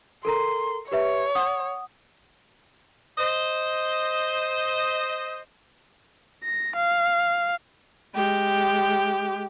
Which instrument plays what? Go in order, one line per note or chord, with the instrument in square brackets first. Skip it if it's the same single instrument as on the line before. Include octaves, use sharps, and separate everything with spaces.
[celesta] A4 A#4 A#5 [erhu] C6
[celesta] G4 B4 E5 [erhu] C#5
[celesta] F#5 D#6
[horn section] C5 D#5
[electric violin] A#6
F5
[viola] G#3 G4